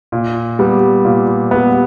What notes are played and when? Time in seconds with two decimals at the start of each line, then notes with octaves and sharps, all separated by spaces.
0.12 A#2
0.59 G3 B3
1.05 A#2
1.51 G3 B3